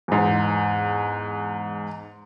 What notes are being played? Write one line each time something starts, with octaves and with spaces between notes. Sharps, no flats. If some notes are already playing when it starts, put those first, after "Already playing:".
E2 G#2